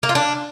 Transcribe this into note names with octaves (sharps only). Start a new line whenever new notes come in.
A#3
F4
D4